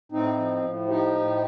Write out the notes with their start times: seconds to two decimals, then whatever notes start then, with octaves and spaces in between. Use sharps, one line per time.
0.12 A2 C4 D#4
0.37 F3
0.63 A2
0.89 F3 D#4 G4
1.14 A2